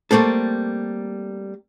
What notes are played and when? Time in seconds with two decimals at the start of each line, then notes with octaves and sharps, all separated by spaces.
0.11 G3 A3 A#3 C4 A4